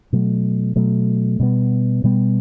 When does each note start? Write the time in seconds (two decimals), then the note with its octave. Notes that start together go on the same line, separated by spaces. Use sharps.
0.13 B2 F#3 A3
0.76 B2 F#3 A3
1.40 B2 G3 B3
2.04 B2 G3 B3